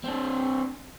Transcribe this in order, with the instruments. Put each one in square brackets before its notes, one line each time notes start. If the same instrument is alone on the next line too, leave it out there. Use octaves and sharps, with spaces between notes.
[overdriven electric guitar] C4 D4